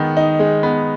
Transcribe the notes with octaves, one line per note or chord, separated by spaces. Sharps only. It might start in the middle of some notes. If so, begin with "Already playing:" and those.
Already playing: D#3 G#3 B3
D#4
G#3
B3